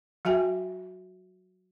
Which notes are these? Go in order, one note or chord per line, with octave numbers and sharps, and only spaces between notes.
F#3 F#4 E5 G5 G#5